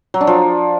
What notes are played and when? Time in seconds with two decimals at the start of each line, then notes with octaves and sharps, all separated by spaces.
0.14 F#3
0.21 D4
0.27 F3